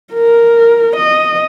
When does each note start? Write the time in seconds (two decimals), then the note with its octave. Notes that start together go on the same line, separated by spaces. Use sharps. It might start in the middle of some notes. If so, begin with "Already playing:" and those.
0.14 A#4
0.96 D#5